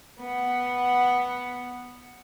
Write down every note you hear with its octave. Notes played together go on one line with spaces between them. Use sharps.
B3 F#5